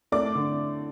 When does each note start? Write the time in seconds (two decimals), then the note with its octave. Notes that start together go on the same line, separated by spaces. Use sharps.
0.12 A3 D5 D6
0.35 D3